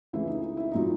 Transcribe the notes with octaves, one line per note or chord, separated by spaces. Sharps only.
C#2 C#3 E3 A3 E4
D#4
D#4
E4
A#2 F#3 D#4